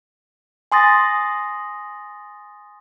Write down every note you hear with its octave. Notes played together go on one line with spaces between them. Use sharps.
G#5 C6 D#6 A6 A#6